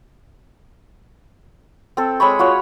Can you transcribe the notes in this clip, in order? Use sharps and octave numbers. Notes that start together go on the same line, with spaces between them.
C4 A4
G#3 C#5 B5 C#6
F4 F#4 C#5